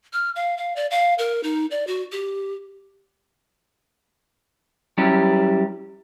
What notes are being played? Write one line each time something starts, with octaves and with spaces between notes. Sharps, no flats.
F6
F5
F5
D5
F5
A#4
D#4
D5
F#4
G4
F#3 G3 C#4 E4 G4